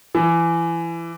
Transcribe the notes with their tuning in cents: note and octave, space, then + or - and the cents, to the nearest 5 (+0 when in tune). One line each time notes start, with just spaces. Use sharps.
E3 +25